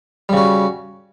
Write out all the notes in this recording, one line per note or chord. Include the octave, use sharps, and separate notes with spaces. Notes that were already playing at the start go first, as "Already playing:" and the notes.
C#3 G3 F#4